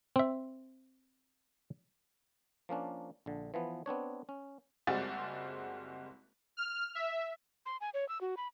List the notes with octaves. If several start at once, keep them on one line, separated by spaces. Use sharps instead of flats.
C4 E5
F3 A#3 C#4 D4
A#1 D3
E3 F3 B3
B3 C4 D4 C#5
C#4
F#1 G3 G#3 C4 F#4 A6
F6
E5
C6
G#5
C#5
E6
F#4
B5